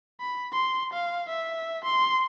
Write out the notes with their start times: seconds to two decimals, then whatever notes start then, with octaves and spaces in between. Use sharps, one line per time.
0.20 B5
0.53 C6
0.94 F5
1.29 E5
1.84 C6